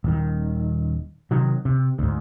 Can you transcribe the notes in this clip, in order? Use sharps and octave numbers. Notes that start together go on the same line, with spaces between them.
D#1 D#3
C3 D#3 F#3
C3
D2 G#2